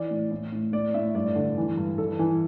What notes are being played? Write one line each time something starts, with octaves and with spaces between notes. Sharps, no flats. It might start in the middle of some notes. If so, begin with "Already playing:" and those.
Already playing: E3 D5
A2
A2
A2
A2 D5
A2 E5
G2 D5
D3
E3
G2
E3 A4
E3